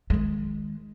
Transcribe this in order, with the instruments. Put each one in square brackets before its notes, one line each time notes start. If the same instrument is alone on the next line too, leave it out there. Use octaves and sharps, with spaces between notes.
[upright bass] D#3 G#3